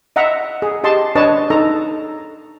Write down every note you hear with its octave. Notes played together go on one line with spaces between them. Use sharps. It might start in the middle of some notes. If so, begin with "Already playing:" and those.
D#5 E5 F#5 A#5
G#4
G4 D#5 A5 C6
D4 B4 C#5 D#5 A5
D#4 A4 A#5